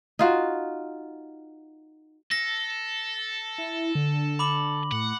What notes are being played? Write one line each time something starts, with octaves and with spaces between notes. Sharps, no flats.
D#4 F4 F#4
A4 A#6
E4
D3
B5 D6 F#7
A2 F#5